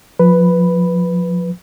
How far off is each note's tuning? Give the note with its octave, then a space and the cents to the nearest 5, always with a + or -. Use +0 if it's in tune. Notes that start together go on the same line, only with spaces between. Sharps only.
F3 +30 B4 +0 B5 +0